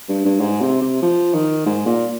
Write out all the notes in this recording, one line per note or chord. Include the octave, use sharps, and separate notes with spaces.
G2
G2
G#2
C3
C3
F3
D#3
G#2
A#2